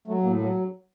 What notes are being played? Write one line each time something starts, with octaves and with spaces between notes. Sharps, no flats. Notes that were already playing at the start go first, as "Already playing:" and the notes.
F#3 A3
A2 A#3
F#3 A#3